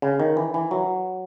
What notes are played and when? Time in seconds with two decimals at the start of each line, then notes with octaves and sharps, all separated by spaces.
0.02 C#3
0.20 D#3
0.37 E3
0.54 E3
0.71 F#3